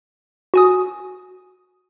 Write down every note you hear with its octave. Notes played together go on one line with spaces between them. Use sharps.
F#4 G#5 D#6